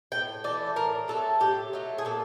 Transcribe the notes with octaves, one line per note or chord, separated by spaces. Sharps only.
A2 G5
E3 A3 D5
A2 A#4
F#3 A3 A4
A2 G4
F#3 A3
G#4
A#2 A4